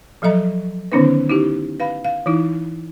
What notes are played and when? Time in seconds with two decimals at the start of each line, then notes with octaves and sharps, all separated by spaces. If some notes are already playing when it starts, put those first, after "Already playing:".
0.22 F3 F#3 A4 D#5 A#5
0.92 D3 D#3 B3 C#4 D#4 B4
1.30 D#4 E4 G4
1.80 B4 F5 B5
2.05 F5
2.26 E3 D#4 E4